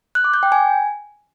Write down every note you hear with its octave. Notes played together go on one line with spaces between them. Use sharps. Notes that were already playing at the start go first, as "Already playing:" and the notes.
F#6
D6
G6
G5
G#5